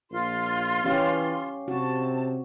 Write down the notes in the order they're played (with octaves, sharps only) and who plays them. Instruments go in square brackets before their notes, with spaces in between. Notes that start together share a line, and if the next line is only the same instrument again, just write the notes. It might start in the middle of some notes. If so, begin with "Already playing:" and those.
[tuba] A#1 [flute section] F4 C6
[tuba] E3 [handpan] C#4 G4 F5
[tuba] C3 [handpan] F#4 [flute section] A5